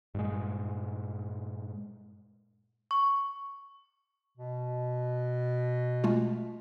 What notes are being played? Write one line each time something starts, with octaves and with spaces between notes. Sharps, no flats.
G2 A#2 G#3
C#6
B2
G#3 A3 F4